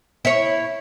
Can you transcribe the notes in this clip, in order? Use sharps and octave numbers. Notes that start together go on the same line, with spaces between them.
E4 C#5